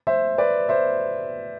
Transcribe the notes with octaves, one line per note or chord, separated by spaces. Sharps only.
C5 E5
B4 D5
C5 E5